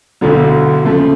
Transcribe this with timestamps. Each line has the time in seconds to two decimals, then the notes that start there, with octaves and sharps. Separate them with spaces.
0.21 E1 D2 D3 F#3
0.84 C#3 F3 A3